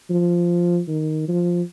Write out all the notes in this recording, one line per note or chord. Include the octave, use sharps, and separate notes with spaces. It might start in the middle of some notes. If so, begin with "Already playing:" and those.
F3
D#3
F3